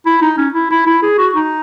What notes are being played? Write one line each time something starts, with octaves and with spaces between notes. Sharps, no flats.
E4
D#4
C#4
E4
E4
E4
G#4
F#4
D#4